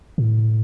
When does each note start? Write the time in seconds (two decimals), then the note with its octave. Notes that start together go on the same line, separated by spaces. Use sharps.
0.18 A2